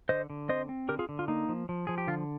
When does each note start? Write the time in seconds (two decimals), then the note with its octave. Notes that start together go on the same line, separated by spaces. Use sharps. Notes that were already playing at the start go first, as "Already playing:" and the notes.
0.09 D3 C5 D#5
0.30 D3
0.49 C4 C5 D#5
0.69 C4
0.89 D3 G4 A#4
0.99 F4 G#4
1.09 D3
1.19 F4
1.28 A#3 D#4
1.49 F3
1.69 F3
1.87 F3 G#4
1.98 G4
2.07 D3 F4